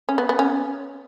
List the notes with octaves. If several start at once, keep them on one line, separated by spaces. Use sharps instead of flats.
C#4
B3
B3
C#4